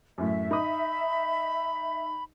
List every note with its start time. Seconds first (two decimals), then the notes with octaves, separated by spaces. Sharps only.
0.18 F#2 A2 E5
0.51 D#4 B5 D#6